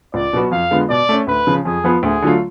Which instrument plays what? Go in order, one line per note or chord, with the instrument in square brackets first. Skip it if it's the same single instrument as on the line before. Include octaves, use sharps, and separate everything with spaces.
[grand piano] C#2 [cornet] D5
[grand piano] B2 F#3 B3 F#4
[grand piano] F2 [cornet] F5
[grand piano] D3 G#3 B3 F4
[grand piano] B2 [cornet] D5
[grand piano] A3 C#4
[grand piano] D2 [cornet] B4
[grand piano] C#3 F3
[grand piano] F2 [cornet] G#4
[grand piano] F3 B3 F4 B4
[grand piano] D2 [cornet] G#4
[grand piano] D3 F#3 A3 F4